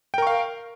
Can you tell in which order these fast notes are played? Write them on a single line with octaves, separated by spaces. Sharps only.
G5 A#4 C#6 F5